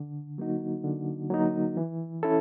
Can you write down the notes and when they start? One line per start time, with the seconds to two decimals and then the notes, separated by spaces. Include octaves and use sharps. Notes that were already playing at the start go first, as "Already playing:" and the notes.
Already playing: D3
0.38 F#3 A#3 D#4 F#4
0.84 D3
1.30 F#3 A#3 D#4 F#4
1.77 E3
2.23 C#4 E4 A4